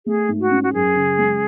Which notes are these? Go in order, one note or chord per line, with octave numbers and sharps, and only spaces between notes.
A3 G#4
G#2
F#4
C#4
F#4
F#2 G#4
C#3
G#3